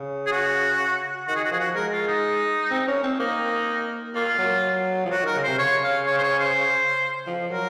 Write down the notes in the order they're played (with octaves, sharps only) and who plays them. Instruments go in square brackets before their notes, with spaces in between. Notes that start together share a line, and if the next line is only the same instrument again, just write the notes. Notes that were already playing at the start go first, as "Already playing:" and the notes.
Already playing: [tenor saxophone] C#3
[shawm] G#4
F#4
[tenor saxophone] D#3 [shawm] F#4
[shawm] G#4
F#4
[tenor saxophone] F3 [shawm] G#4
[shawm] F#4
[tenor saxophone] G#3 [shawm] A#4
[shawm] F4
D#4
[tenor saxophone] C4
C#4
C4
[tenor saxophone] A#3 [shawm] D#4
[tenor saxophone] A#3 [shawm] F4
[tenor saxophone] F#3
F3
[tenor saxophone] F#3 [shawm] F#4
[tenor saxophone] D#3 [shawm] A#4
[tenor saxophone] C#3
[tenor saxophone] C3 [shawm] C5
[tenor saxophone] C#3 [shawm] C#5
[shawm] F5
C#5
C5
C#5
C5
[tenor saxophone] F3
[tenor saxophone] F#3 [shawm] A#4